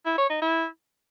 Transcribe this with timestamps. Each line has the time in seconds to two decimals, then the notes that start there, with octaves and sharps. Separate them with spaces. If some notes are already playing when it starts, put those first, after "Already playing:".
0.06 E4
0.18 C#5
0.30 D#4
0.42 E4